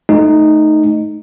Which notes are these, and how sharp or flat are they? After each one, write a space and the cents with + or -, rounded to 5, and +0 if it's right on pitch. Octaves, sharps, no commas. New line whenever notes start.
A3 -15 D#4 -10